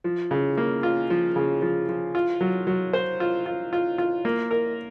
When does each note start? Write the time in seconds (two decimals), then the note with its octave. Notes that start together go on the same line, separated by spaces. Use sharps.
0.04 F3
0.31 C#3
0.58 A#3
0.83 F4
1.10 F3
1.36 C#3
1.62 F3
1.89 F3
2.15 F4
2.41 F#3
2.67 F#3
2.93 C5
3.20 F4
3.46 F4
3.73 F4
3.98 F4
4.25 A#3
4.51 A#4